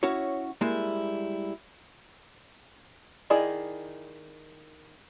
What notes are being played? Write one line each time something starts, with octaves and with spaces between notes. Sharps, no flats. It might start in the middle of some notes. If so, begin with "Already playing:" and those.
C#4 E4 F#4 C#5
G3 G#3 A#3 E4
D#3 E4 G#4 D5 D#5